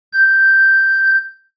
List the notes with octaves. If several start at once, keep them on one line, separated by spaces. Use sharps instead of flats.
G6